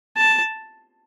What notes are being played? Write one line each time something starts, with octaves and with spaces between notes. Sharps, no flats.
A5